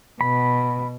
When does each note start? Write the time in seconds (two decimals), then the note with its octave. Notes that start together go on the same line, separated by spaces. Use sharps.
0.21 B2 B5